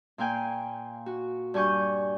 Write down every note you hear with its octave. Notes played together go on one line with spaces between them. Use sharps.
A#2 A#3 F5 G5 G#5
F#4
G2 D4 G#5 C#6 G6